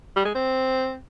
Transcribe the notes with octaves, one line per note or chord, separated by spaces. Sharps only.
G3
G#3
C4